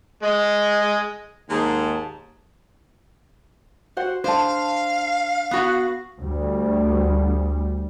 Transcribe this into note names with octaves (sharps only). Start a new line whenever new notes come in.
G#3 D#5
D#2 G#2 G#3 A5
F#4 C5 F#5
D4 C5 F5 A5
B3 F#4 F#5
D2 G3